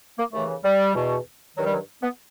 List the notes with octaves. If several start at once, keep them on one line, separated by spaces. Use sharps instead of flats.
A#3
D#2 C#3 E3 A3
G3
E2 B2
G2 D#3 F#3
G3
F#3
B3